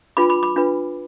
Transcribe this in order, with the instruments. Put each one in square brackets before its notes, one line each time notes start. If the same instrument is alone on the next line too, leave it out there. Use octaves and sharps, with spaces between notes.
[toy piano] D4 F4 B4 B5 D6
B5 D6
B5 D6
D4 F4 B4